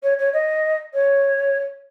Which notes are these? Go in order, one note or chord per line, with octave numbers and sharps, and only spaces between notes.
C#5
C#5
D#5
C#5